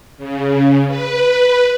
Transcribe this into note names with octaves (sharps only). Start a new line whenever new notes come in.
C#3
B4